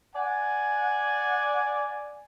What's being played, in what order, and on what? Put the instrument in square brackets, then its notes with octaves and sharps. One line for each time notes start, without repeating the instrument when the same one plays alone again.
[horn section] D5 F#5 G#5